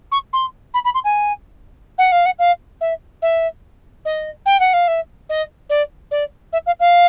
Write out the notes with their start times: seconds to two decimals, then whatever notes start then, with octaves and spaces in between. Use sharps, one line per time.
0.12 C#6
0.33 C6
0.74 B5
0.85 B5
0.95 C6
1.04 G#5
1.98 F#5
2.12 F5
2.26 F#5
2.39 F5
2.81 E5
3.22 E5
4.05 D#5
4.46 G5
4.60 F#5
4.73 F5
4.88 E5
5.29 D#5
5.70 D5
6.11 D5
6.53 E5
6.66 F5
6.80 F5